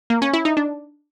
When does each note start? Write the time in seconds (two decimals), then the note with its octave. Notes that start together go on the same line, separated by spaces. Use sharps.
0.10 A#3
0.22 C#4
0.33 E4
0.45 D#4
0.57 D4